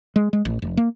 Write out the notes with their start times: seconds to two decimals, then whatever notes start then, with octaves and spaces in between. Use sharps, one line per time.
0.16 G#3
0.33 G#3
0.45 A1
0.62 F1
0.77 A#3